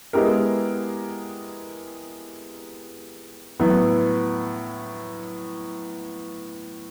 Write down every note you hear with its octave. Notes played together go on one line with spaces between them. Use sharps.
G#3 B3 E4 G4 A#4
A2 F#3 B3